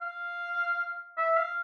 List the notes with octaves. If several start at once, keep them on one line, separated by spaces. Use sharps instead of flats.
F5
E5
F5